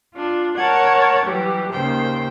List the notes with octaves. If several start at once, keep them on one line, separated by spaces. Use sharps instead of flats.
D4 F4
A#4 C#5 F#5 A5 G#6
E3 F#3 G3 G4
D#2 C#3 C5 G5